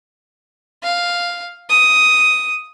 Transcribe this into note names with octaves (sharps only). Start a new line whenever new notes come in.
F5
D#6